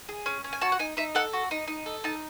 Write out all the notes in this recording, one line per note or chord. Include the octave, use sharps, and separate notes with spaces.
G#4
C#4
C#4
G#5
F#4 A5
F#5
D#4 G#5
D#4 E5
A4 F#5
F#4
D#4
D#4
A4
D#4 A5